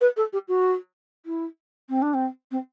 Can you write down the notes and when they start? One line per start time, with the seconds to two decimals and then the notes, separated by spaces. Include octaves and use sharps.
0.01 B4
0.16 A4
0.33 G4
0.48 F#4
1.25 E4
1.89 C4
2.02 D4
2.14 C4
2.51 C4